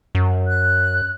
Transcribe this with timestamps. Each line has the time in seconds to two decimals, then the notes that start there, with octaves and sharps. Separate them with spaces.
0.15 F#2
0.47 F#6